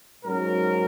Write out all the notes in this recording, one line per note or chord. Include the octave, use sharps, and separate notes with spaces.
G#2 F#3 C#4 A#4